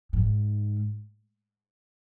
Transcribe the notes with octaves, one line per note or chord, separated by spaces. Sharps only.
G#2